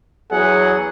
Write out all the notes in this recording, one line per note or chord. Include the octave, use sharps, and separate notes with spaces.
E2 F#3 G#4 F#5